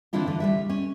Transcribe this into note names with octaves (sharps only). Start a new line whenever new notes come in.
D3 E3 C4 D4 E4 F4
D3 E3
D2 G3 E5
C#4